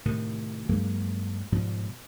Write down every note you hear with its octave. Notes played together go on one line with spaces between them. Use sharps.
A2 C3 D#3
G2 F#3 G#3 A#3
G#2 B2 F3 G3